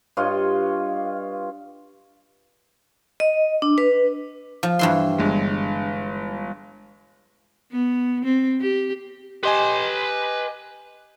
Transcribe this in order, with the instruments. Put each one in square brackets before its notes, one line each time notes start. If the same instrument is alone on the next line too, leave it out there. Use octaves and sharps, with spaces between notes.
[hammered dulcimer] G2 F4 C#5 D#5
[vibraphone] D#5
D4
B4
[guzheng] F3
G2 E3 C6
[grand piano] G1 G#3
[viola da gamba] B3
C4
G4
[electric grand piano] G4 D#5 G#5 [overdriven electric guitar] B4 C6